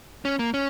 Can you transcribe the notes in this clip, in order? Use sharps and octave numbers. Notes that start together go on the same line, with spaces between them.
C#4
A#3
C#4